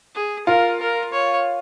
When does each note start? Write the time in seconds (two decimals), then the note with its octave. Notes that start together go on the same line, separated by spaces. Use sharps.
0.15 G#4
0.47 F4 A#4
0.80 A#4
1.13 C#5